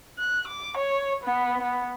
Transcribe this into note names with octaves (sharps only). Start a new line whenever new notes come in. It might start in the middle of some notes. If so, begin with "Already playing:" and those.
F#6
D6
C#5
B3
B3